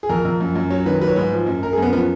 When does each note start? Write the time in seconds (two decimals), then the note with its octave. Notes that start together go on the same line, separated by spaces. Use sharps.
0.03 G#4
0.09 F2 A#4
0.25 F2
0.40 F#2
0.55 F#2
0.70 F#3 C#5
0.86 D#3 B4
1.01 F#3 B4
1.09 C#5
1.16 G#2 B4
1.32 F3
1.47 F#2
1.63 F#2 A#4
1.73 G#4
1.78 F#2 B3
1.93 F3 B3